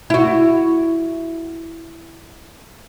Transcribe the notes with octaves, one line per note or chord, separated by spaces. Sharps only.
E4 F#4